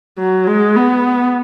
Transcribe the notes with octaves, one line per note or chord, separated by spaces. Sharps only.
F#3
G#3
B3